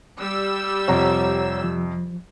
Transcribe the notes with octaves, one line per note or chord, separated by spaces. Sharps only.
G3 E6
F2 C3 C#5 F#5 A#5
F3